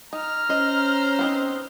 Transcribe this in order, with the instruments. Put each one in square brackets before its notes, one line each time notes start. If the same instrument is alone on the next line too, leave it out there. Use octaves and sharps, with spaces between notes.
[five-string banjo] D#4 [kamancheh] A#5 F6
[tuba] C#4 [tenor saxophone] C5 [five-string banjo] D#5
[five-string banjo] B3 C4 D#4